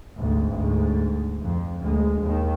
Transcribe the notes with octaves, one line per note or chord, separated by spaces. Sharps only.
G#1 D2
D2 G#2
F2
D2 G#3
D#2 D#3